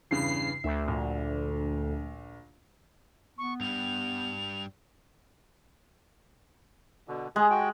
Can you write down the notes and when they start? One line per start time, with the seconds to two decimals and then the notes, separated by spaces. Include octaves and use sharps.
0.11 E2 G2 C#3 C7
0.64 D2 E5
0.88 A#1
3.38 B3 C#6
3.61 G2 G3 F7
7.08 B2 D3
7.36 G#3 G#4
7.51 F#4 G5